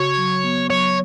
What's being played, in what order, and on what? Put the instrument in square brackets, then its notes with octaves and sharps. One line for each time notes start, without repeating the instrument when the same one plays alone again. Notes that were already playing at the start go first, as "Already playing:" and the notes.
Already playing: [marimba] C#3 F#4 [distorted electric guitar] C#5
[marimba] F#3
B3
[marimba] F#3 [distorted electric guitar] C#5